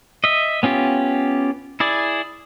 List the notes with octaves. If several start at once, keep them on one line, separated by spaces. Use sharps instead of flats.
D#5 E5
B3 C#4 F4 G4
E4 G#4 D5